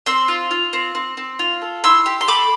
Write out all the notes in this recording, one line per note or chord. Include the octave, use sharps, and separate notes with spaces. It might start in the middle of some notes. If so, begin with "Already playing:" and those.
C4 C6 E6
F4
F4
C4
C4
C4
F4
A4
E4 C6 E6
G4
C6
A3 B5 D6